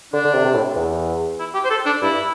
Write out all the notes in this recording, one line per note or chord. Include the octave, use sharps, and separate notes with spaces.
D3 D4
D3
C3
C3
A2
E2
E4
G4
C5
A4
D4
G2 E4